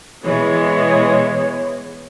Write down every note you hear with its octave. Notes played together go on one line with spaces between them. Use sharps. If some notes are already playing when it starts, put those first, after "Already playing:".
B2 E3 G#3 C#5